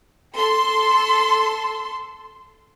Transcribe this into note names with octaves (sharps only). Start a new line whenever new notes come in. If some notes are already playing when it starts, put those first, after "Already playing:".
A4 C6